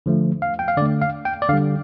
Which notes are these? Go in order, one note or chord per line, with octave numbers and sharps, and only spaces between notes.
D3 F3 A3
F5
G5
F5
D3 A3 D5
F5
G5
D5
D3 G3 F5